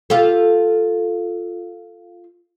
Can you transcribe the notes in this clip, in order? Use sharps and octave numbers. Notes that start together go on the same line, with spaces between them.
F4 G4 A4